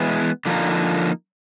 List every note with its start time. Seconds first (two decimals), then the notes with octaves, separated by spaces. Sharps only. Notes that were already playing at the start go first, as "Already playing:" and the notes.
Already playing: E3 G#3 B3 E4
0.46 D3 F3 A#3 D#4